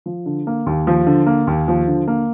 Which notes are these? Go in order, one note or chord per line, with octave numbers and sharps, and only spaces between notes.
F3
D3
A#3
D#2
F3
D3
A#3
D#2
F3
D3
A#3